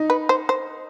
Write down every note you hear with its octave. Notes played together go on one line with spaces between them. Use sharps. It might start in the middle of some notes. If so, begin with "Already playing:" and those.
Already playing: D#4
B4
C5
C5